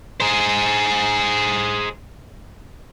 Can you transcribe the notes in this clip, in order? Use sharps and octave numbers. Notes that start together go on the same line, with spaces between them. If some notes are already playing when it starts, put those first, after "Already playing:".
G#4 C5